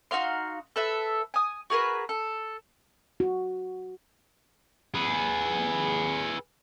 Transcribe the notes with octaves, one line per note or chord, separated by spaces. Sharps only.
D#4 F#4 F5 C6
A4 B4 E5
G#5 D#6
F#4 G#4 A#4 B4
A4
F#4
G#4 B4